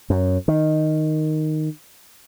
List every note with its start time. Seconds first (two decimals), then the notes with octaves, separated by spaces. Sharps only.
0.10 F#2
0.48 D#3